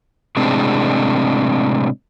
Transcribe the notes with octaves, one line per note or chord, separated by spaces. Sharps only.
A2 C3 G#3 C4 D4